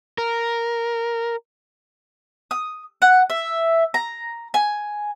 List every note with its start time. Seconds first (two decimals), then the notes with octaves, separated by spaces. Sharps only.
0.18 A#4
2.51 D#6
3.02 F#5
3.30 E5
3.94 A#5
4.54 G#5